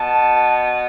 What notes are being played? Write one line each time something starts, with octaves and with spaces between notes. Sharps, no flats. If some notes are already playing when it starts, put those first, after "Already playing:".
Already playing: B2 B3 A5